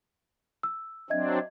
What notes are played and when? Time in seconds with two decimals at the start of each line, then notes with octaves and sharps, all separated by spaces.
0.63 E6
1.10 F#3 C4 D4 D#5 E5 G#6